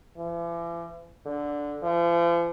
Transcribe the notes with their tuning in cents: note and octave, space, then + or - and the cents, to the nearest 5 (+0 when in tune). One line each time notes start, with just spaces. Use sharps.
E3 +45
D3 -5
F3 -40